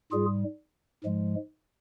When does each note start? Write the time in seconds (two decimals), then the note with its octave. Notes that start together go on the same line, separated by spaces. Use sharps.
0.12 G#2 G3 F4 G#4
1.04 G#2 F3 G#3